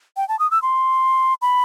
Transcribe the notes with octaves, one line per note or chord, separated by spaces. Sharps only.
G5
A5
D#6
E6
C6
B5